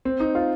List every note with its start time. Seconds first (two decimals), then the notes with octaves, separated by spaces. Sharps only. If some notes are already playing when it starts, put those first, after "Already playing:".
0.05 C4
0.20 D#4
0.35 F4